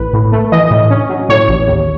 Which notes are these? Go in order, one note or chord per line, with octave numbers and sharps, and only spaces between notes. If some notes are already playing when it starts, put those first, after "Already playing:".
Already playing: A1 B4
A2
A3
E3 D#5
A2
C#4
F#3
A2 C#5
A1
D#2